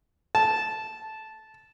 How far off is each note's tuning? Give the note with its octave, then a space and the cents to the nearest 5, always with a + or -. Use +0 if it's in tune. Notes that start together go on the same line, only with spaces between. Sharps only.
A5 -10